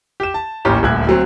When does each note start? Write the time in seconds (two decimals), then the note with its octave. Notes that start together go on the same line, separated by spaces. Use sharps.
0.20 G4 E7
0.34 A5
0.65 A1 D#2 C#4 G4 A#5
0.83 D#1 D2 F#6 G#6
1.07 D2 F#3 C4